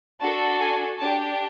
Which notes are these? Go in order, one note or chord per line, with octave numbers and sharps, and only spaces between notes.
D4 F#4 A4 A5
G#5
D4 G4 A5